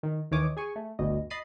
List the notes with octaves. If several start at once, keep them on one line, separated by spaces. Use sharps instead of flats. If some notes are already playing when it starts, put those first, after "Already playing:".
D#3
D#2 D#3 E3 C#5 D6 D#6
G#4 G#5 C#6
A3
G1 D2 B2 D#5
D#5 B5 A6 C7 D#7